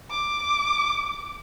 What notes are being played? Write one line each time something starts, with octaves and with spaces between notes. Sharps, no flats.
D6